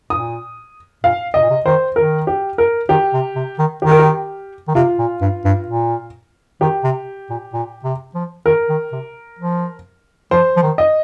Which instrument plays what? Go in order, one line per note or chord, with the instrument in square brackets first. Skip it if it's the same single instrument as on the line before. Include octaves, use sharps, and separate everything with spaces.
[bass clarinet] A#2 [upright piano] D#6
[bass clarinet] A#2 [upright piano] F5
[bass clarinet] C3 [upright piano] D#5
[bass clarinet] A#2
C3
[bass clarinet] D#3 [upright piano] C5
[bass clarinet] D#3 [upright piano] A#4
[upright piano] G4
A#4
[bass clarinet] D#3 [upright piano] G4
[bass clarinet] C3
C3
D#3
[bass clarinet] D#3 [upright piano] G4
[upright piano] A#4
G4
[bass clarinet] D#3
[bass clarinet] C3 [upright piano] F4
[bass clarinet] A#2
G2
G2
A#2
[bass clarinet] D#3 [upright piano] G4
[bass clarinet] C3
A#2
A#2
C3
F3
[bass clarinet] D#3 [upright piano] A#4
[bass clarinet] D#3
C3
F3
[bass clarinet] F3 [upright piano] C5
[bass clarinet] F3
D#3
[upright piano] D#5